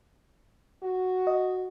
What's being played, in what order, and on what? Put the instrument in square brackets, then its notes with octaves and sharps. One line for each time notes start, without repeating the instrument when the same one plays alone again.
[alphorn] F#4
[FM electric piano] D#5